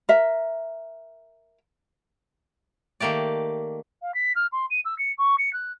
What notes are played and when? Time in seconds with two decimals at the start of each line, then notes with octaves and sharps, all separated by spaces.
0.09 A#4 E5
3.00 D#3 A3 A#3 G4 D5
4.02 F5
4.14 B6
4.35 F6
4.52 C6
4.70 D#7
4.85 E6
4.98 C#7
5.18 C#6
5.38 C#7
5.53 F#6